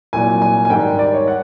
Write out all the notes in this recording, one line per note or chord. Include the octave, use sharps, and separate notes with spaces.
C2 A#2 F#3 G#5
G#5
G#5
G#2 D#3 G3 G5
D5
C#5
F#5